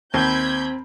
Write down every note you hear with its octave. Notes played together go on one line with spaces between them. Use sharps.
D#2 C4 B5 G6 G#6